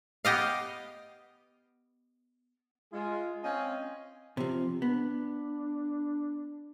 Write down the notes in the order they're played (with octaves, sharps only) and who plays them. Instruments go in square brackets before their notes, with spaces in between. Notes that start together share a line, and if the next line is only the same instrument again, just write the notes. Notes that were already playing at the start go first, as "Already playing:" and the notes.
[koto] B3 G4 D#5 F5
[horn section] G#3 F4 G#4
C4 C#4 D#5 F5 G#5
[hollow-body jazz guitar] C3 F3
[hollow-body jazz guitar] B3 [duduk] D4